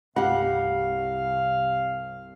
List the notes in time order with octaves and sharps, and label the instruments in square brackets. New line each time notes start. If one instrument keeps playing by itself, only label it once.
[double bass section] C2 [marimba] G2 [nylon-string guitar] G4 F#5 [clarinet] F5